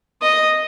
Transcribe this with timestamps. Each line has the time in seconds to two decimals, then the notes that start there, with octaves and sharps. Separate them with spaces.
0.22 D#5